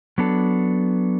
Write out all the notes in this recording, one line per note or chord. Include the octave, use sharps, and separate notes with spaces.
F#3 B3 D4 A4